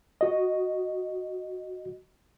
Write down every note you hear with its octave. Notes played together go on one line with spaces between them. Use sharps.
F#4 D#5